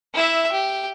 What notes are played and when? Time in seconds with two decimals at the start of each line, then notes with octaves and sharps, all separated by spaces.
0.14 E4 E5
0.52 G4